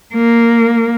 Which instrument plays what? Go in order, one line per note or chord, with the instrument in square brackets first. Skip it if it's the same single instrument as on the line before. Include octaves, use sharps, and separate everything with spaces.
[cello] A#3